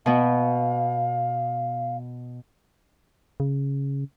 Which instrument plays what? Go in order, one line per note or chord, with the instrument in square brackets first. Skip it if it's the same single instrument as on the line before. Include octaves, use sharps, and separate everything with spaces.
[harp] B2 B3 [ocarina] F5
[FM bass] C#3